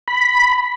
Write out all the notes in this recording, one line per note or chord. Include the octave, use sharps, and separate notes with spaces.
B5